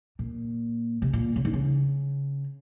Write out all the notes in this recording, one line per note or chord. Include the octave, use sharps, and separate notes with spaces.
A#2
C3
A#2
C#3
D#3
C#3